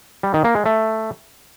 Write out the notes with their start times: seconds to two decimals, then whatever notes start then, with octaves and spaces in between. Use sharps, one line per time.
0.23 G3
0.34 D#3
0.44 A#3
0.55 G#3
0.66 A3